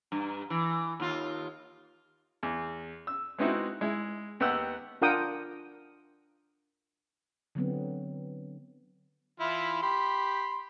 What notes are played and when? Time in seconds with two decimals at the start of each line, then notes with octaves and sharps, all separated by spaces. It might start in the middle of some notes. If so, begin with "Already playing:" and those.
0.12 G2
0.50 E3
1.00 D#2 F4
2.43 E2
3.07 E6
3.38 G#3 B3 C4 D#4 E4 F#4
3.81 G#3 E4
4.40 D#2 B3 G4 F#5 E6 F#6
5.02 D4 F4 A#4 F#5 G5 D#6
7.55 D3 F#3 B3 C4
9.40 E3 E4 F4
9.83 G4 B5 C6